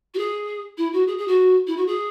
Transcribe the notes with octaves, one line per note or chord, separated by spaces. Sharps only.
F#4
G#4
E4
F#4
G#4
G#4
F#4
E4
F#4
G#4